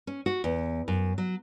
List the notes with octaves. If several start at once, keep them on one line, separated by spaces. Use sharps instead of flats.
C#4
F#4
E2
F#2
F#3